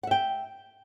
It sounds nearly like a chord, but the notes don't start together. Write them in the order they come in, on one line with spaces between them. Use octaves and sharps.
F#5 E5 G5